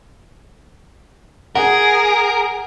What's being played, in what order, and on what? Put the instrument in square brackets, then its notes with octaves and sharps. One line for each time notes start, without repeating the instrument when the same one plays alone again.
[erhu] G#4 [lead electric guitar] A#4 [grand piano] F#5